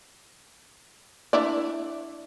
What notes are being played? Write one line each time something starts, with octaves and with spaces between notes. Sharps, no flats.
D4 E4 D5